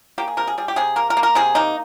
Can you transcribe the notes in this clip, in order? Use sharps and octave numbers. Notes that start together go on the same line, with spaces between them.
A#3 G4
G#4
C3 A#4
G#4
G3 G#4
G4
C3 G#4
A#3 A#4
A#4
A#3
A#4
C3 G#4
A#3 D#4